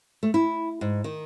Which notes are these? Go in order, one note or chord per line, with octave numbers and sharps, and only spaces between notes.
A3
E4
G#2
D#3